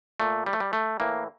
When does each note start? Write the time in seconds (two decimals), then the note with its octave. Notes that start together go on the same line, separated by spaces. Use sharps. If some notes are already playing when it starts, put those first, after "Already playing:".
0.20 A#2 A3
0.46 G3
0.53 A3
0.60 G3
0.73 A3
1.00 A2 E3 A#3